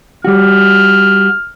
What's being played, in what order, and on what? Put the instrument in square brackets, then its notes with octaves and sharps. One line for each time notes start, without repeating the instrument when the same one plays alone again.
[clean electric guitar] G3 F#4 [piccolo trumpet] F6